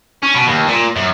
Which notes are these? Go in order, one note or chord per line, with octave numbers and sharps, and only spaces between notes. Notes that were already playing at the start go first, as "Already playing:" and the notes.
C#4
B2
D#2
A#2
F#2